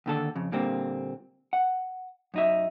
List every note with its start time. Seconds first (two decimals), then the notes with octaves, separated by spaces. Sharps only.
0.06 D#2 D3 A4
0.35 F2 C#3
0.52 A#2 D3 G3 A#3 C4
1.53 F#5
2.34 F#2 D#4 E5